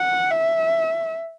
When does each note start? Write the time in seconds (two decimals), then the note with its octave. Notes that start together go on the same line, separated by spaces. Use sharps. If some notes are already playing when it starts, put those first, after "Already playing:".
Already playing: F#5
0.31 E5